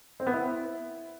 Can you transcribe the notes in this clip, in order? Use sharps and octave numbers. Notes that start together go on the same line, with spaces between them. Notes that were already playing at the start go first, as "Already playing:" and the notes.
C4
B3
E4